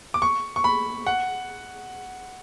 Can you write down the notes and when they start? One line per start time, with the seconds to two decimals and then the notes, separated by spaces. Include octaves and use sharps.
0.14 D6
0.22 C#6
0.56 C#6
0.64 B5
1.06 F#5